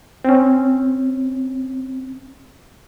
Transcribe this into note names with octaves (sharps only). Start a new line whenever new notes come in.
C4 C#4